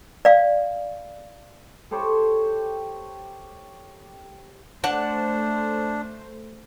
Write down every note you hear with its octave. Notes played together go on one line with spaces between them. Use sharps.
D5 F5
G4 A4 C5 C#5
A3 D4 C5 D5 F#5 A5